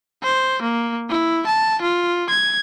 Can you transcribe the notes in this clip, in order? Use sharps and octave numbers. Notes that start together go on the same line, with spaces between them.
C5
A#3
E4
A5
F4
G#6